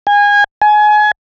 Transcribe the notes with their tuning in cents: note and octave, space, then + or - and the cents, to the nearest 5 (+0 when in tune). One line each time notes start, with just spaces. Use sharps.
G#5 -25
G#5 +25